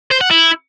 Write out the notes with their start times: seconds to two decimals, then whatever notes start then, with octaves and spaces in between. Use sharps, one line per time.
0.11 C5
0.21 F#5
0.31 E4